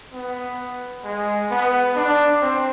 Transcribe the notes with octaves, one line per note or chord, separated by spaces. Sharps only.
B3
G#3
B3
D4
C4